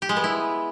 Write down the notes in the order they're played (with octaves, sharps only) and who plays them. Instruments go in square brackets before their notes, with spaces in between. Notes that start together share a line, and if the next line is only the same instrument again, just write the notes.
[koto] G4
G#3
B3
E4